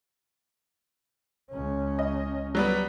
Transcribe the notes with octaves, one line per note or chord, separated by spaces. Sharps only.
C#2 C#4
D#5
F#3 G3 B3